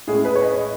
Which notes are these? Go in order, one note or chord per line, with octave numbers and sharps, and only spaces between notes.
A2 G#3 C#4 G#4
B4
C#5
D#5